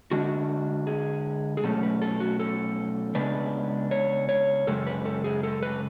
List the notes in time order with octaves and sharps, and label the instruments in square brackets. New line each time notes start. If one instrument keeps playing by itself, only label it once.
[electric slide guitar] D3 G#3 D4 F#4
G#4
G#4
B2 F#3 A3 C#4 A4
B4
A4
F#4
A4
C#3 G#3 B3 D4 B4
C#5
C#5
F#2 C#3 G#3 A4
B4
A4
G#4
A4
B4